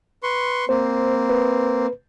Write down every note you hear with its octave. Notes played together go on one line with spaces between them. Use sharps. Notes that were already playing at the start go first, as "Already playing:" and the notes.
B4 C6 C#6
A#3 C4 C5
B4